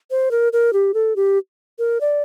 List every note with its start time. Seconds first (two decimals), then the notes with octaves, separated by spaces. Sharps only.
0.11 C5
0.31 A#4
0.53 A#4
0.73 G4
0.94 A4
1.16 G4
1.79 A#4
2.01 D5